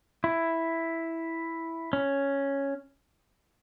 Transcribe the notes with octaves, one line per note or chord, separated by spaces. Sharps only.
E4
C#4